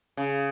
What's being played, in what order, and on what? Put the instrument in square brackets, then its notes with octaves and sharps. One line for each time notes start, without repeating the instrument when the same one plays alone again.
[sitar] C#3